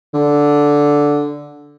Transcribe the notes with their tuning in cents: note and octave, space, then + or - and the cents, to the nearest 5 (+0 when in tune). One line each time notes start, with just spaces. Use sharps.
D3 -5